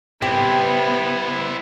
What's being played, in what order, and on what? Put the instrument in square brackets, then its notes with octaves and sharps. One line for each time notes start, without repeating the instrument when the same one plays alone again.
[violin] B3 [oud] C4 G4 [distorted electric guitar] E4 C5